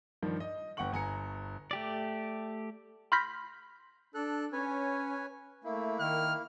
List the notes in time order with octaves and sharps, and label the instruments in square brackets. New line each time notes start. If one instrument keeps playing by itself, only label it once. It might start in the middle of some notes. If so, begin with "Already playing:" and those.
[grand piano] G2 D#3 F3
D#5
G1 F#5 G5 C#6 F#7
G1 G#5 A#5 C#7
[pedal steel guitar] A3 G4 D5
[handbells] B5 C6 F6 G6 A#6 B6
[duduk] D4 [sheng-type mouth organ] A4 F#6
[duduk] C#4 [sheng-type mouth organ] B4 C#5 G#5
[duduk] A3 [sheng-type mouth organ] A#3 E4
[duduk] D#3 [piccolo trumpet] F6